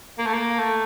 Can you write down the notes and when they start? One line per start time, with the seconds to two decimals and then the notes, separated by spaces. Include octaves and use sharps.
0.18 A#3
0.26 A3
0.33 A#3
0.59 A3